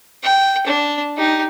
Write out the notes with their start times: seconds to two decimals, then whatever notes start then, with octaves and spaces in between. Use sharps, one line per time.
0.23 G5
0.66 D4
1.17 D#4 G4